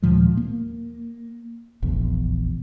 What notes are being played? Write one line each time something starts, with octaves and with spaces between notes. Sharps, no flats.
D#2 A#2 F3 G#3
A#3
F1 A#1 E2